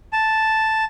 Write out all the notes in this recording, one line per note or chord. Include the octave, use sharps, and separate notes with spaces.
A5